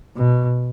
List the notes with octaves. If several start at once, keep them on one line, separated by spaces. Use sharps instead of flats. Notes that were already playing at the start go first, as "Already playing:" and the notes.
B2